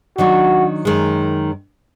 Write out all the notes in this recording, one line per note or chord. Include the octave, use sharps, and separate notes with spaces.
D#3 F#3 D4 F#4
F#2 D#3 G#3